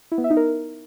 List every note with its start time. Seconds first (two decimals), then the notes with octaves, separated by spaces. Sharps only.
0.12 E4
0.18 B3
0.24 E5
0.30 D#4
0.37 A#4